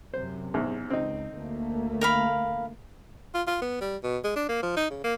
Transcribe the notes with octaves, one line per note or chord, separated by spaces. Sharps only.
F#2 C3 C5
E2 G#2
C#2 C4 D#4
D2 A3 A#3
A#4 F5 B5
F4
F4
B3
G3
B2
G#3
D4
A#3
F3
D#4
C#3
A#3